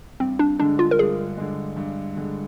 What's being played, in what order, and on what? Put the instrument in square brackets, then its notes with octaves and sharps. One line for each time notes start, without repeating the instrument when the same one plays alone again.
[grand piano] G2 [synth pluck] C4
[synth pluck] D4
[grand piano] D3 G#3 [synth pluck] D4
[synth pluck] F4
A#4
[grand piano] G2 [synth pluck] G#4
[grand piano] D3 G#3
G2
D3 G#3